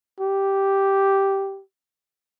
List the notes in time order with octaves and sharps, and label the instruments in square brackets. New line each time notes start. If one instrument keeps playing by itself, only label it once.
[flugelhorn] G4